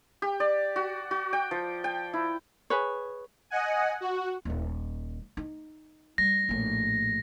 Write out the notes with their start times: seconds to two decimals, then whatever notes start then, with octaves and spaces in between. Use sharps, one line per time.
0.22 G4
0.40 D5
0.76 F#4
1.11 F#4
1.33 G5
1.51 F3
1.84 G5
2.13 E4
2.70 G#4 B4 C#5
3.50 D#5 F#5 G#5
4.01 F#4
4.45 D#1 D#3
5.37 D#4
6.18 G3 A#6
6.49 A#1 A2